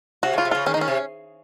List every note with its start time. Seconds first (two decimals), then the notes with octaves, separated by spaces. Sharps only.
0.23 C3 F#4
0.34 C#3 F4
0.45 C3
0.51 C#3 F4
0.66 D#3 C#4
0.74 D#4
0.77 D#3 C#4
0.88 C3